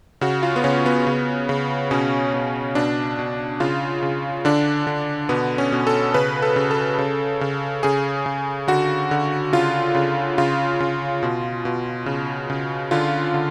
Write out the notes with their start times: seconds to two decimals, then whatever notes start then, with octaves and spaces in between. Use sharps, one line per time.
0.21 C#3 F#4
0.43 F4
0.56 B3
0.64 C#3 C#4
0.86 B3
1.07 C#3
1.49 C#3
1.91 B2 C#4
2.34 B2
2.75 B2 D4
3.19 B2
3.60 C#3 F4
4.02 C#3
4.45 D3 D4
4.87 D3
5.29 B2 B3
5.58 C#4
5.72 B2
5.87 A4
6.14 C#3 B4
6.42 A4
6.56 C#3
6.71 A4
6.99 C#3
7.41 C#3
7.83 C#3 G#4
8.26 C#3
8.68 D3 F#4
9.11 D3
9.53 C#3 F4
9.95 C#3
10.38 C#3 F4
10.80 C#3
11.23 B2
11.65 B2
12.06 C#3
12.50 C#3
12.91 D3 F4
13.34 D3